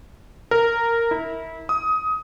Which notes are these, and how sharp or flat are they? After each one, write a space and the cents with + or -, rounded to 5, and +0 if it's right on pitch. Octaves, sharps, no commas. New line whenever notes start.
A#4 -10
E4 -25
D#6 +20